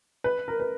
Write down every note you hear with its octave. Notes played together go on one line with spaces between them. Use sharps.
B4
A#4
B4